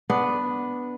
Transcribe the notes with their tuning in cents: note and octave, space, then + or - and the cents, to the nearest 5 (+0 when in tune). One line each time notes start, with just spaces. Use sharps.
B3 +0 D4 +0